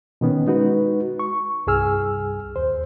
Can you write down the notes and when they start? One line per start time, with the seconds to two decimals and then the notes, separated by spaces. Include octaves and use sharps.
0.21 B2 D#3 B3 C#4
0.47 G#3 D#4 F#4 B4
1.19 C#6
1.67 C2 G2 G#4 G#5 E6 F6
2.56 D#2 C5